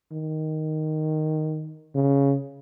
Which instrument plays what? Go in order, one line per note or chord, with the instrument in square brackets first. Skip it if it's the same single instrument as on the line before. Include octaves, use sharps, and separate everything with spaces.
[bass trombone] D#3
C#3